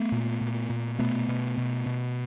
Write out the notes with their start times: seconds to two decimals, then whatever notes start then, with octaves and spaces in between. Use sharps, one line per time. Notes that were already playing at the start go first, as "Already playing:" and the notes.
Already playing: A3 B3
0.12 A#2
0.41 A#2
0.70 A#2
0.99 B2 A3 B3
1.28 B2
1.58 B2
1.86 B2